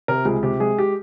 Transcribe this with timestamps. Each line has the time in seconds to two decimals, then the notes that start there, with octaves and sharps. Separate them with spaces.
0.08 C3 A#4
0.25 C#2 G#4
0.43 C3 G4
0.60 G#3 G#4
0.78 G4